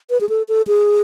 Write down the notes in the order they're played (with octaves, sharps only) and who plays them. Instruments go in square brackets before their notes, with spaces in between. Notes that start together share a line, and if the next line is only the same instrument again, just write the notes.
[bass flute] B4
G#4
A4
A4
G#4